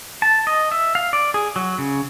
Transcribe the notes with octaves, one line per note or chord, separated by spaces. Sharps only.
A5
D#5
E5
F5
D5
G#4
F#3
C#3